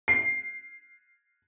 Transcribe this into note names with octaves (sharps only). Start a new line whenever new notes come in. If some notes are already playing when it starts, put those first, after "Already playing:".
C7